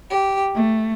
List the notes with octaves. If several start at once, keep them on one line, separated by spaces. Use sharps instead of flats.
G4
A3